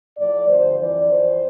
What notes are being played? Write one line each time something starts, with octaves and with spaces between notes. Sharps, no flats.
A2 F3 D5
G2 D3 F3 C5
F2 E3 D5
F2 E3 C5